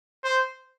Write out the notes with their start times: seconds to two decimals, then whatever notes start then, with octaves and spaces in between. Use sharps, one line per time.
0.24 C5